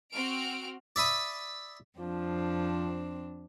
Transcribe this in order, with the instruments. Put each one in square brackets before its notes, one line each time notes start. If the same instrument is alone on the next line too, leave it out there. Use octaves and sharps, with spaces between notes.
[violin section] C4 F#4 F6 D7
[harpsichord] D5 E5 B5 D#6
[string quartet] F2 C4 D4 [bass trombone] F3